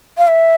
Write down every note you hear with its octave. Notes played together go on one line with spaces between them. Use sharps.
F5
E5